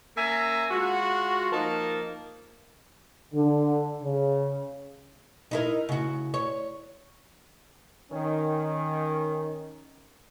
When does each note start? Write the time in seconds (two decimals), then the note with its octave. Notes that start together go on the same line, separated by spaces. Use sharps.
0.17 A#3 C#4 E5 G#5 A#5
0.70 G#3 F4 F#4
1.52 F3 A#3 D#4 A#4 A5
3.34 D3
4.02 C#3
5.51 D#4 E4 A#4
5.89 C#3 F#4
6.34 C#5
8.12 D#3 C#4